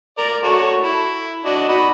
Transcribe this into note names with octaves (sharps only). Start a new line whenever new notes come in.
A#4 D5
F#4 A4 C#5
E4
D4 F#4 D#5
D#4 F#4 B5